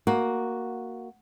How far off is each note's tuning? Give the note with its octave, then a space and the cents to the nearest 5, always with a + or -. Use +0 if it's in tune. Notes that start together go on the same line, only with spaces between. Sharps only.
A#3 +0 F#4 +0